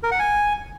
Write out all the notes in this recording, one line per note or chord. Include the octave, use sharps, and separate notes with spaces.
A#4
F#5
G#5